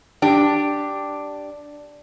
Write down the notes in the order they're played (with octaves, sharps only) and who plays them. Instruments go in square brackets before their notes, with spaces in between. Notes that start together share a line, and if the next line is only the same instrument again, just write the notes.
[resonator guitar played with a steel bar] D4 G4